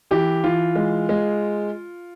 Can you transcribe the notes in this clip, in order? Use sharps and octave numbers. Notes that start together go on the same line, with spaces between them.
E3 G4
E3 F4
G#3
G#3